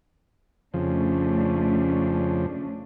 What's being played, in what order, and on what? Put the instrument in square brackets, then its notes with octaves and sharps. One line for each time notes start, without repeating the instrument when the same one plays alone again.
[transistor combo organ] F2 C#3 F3 [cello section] A3 C#4 D4